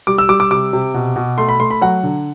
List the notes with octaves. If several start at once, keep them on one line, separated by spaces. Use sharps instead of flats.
G3 D6
E6
G3 D6
D6
C3 D6
C3
B2
B2
A3 C6
B5
A3 C6
B5
F#3 F#5
D3